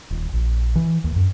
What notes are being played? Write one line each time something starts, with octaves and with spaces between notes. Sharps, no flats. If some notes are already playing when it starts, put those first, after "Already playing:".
D#1
A#1
E3
D#2
F#2